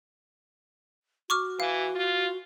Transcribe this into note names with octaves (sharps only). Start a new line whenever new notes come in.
F#4 C#6 D6 F6
E3 F5
F4